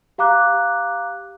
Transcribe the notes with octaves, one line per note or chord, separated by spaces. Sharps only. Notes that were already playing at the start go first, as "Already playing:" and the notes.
G4 F5 A#5 D6 F#6